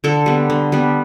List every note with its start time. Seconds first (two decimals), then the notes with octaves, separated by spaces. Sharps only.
0.04 D3 A4
0.26 G3 B3
0.50 D3
0.72 G3 B3